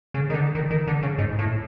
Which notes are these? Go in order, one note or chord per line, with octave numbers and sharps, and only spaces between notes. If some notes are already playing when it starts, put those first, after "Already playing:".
C#3
D#3
D3
D#3
D#3
D3
C#3
G#2
A2